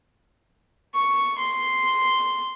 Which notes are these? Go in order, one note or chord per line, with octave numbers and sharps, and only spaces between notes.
C#6
C6